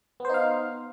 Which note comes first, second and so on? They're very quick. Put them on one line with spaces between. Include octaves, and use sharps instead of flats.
B3 C5 D#4 F5